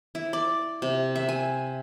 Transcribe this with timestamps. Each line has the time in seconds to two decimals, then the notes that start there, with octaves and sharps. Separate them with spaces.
0.15 E4
0.33 D5
0.82 C3
1.16 E5
1.29 G#5